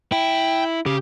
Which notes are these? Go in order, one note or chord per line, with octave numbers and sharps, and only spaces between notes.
E4 G5
C#3 G4